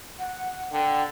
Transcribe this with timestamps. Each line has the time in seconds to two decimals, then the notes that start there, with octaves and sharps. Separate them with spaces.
0.19 F#5
0.72 D3 G5